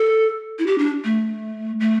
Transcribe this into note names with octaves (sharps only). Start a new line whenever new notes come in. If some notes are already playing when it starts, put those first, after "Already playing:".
Already playing: A4
E4
G4
D4
A3
A3